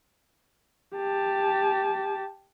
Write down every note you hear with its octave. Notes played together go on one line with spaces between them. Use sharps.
G4 A5